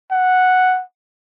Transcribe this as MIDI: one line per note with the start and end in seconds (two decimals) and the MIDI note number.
0.11 0.82 78